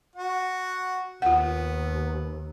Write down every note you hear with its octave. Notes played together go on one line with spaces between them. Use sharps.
F#4 F#5
D#2 B3 F4 F#5